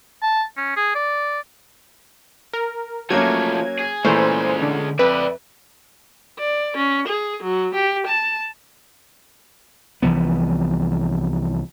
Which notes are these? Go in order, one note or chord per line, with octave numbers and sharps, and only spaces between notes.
A5
C#4
G#4
D5
A#4
F3 F#3 A3 A#3 C#4 G#6
G#4
A#2 E3 G#3 A3 C#4 C5
D3
F2 B4 D5 E5
D5
C#4
G#4
F#3
G4
A5
C2 E3 F3 B3